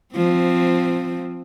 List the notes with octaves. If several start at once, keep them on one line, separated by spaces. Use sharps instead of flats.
F3 C4